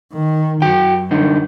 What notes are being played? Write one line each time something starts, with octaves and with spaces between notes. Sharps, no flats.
D#3
F#2 F#4 G5
G2 D3 D#4